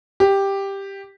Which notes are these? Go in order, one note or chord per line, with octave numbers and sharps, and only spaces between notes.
G4